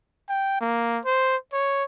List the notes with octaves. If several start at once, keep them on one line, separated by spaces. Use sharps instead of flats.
G5
A#3
C5
C#5